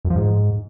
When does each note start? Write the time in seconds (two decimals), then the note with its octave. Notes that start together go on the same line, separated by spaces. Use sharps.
0.05 F#2
0.10 F3
0.16 G#2